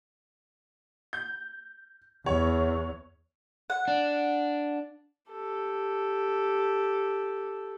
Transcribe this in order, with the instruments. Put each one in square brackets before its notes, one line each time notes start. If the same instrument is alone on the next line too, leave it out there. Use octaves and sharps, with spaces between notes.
[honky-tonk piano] G6
[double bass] E2 [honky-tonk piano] C#5
[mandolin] F#5
[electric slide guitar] D4
[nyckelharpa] G4 A4